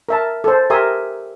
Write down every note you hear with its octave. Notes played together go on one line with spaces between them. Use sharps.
A#4 E5 A5
A4 C5
G4 A#4 E5 G#5 C6 D#6